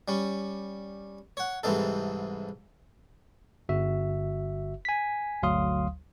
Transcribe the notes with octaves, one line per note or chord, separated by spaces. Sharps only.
G3 C#4
C#5 F#5
C2 G#2 E3 C4 D#4 A4
G1 F#4 E5
G#5 B6
G1 D2 F#3 F5 C6 D#6